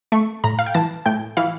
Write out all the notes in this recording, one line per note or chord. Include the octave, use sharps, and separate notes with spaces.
A3 C#6
A2 A#5
F5
G5
E3 A5
A2 G5
E3 F5